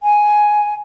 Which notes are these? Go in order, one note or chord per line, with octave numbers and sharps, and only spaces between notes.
G#5